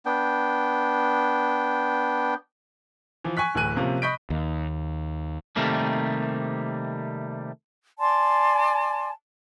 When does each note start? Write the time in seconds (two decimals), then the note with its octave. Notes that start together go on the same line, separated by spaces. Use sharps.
0.06 B3 D4 G5
3.24 E3 F3
3.37 G#5 C#6 F#6 B6
3.55 D1 A2 E3 G#5 F#6 D#7
3.76 C3 F3 A#3 C#4
4.02 D#5 B5 C#6 G6 B6 D7
4.30 D#2
5.56 C3 D#3 G3 A3 A#3
7.99 D5 G#5 A5 C6